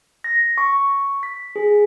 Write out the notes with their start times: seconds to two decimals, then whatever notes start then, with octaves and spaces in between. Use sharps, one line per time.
0.24 A#6
0.58 C#6
1.23 B6
1.56 G#4